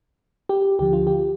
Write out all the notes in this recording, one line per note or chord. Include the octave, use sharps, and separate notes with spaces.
G4
D2 D3 F3 G4
F4
G4